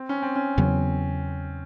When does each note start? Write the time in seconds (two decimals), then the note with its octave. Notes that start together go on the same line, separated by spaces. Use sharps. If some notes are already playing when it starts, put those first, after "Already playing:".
Already playing: C4
0.09 C#4
0.22 C4
0.36 C#4
0.58 E2 C#3 F#3 B3